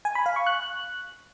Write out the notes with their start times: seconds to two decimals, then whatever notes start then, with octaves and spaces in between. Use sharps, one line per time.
0.05 G#5
0.15 B5
0.26 F5
0.36 C#6
0.47 F#6